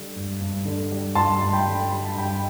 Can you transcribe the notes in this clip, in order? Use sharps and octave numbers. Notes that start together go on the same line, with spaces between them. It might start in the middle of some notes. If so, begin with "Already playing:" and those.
Already playing: D3 G3
G2
G2
D3
G3
G2 A5 C6
G2
C6
G5 B5
D3
G3 B5
A5
G2 G5 B5